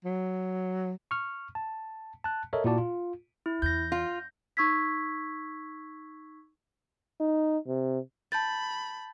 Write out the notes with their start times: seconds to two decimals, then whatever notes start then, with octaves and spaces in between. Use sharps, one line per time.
0.05 F#3
1.11 C#6 F6
1.55 A5
2.24 A5 F#6
2.53 A4 A#4 C#5 D#5 E5
2.64 A#2 E4 F#4 D5 A5
2.78 F4
3.46 E4
3.62 E2 G6 A#6
3.92 F4
4.57 D#4 C#6 E6 G#6 B6
7.20 D#4
7.67 C3
8.32 A5 B5 G6 A6